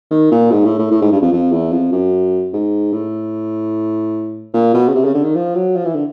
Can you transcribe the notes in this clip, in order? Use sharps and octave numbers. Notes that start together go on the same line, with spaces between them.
D#3
A#2
G#2
A2
A2
A2
G#2
G2
F2
F2
E2
F2
F#2
G#2
A2
A#2
B2
C#3
C3
C#3
D3
D#3
F3
F#3
F3
E3
D3